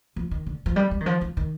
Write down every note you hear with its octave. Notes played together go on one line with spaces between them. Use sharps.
F3
D#3
D3
F3
G3
G3
D#3
F3
F3
D#3